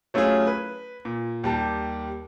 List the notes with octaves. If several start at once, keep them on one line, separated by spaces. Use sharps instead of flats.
F#3 A3 C#4 E4 F4 G#4
B4
A#2
D#2 G3 A5